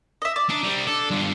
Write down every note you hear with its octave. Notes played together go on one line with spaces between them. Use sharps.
D#5 E5
D5
D4 D#4
G3 C4
D4 A4
G2 F4